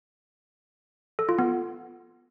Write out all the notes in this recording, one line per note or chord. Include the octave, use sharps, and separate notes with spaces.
A4
F4
B3